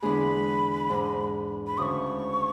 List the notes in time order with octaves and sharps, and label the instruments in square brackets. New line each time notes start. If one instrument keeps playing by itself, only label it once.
[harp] E2 D3 G#3 D4 G#4 [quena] B5
[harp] G#2 G#3 D4
[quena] B5
[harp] D2 C#3 G#3 [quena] C#6 D#6